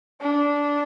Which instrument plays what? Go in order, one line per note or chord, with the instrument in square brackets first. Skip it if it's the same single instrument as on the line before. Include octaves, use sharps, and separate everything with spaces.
[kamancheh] D4